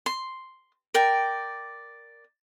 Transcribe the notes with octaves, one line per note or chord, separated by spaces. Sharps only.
C6
A#4 D5 G5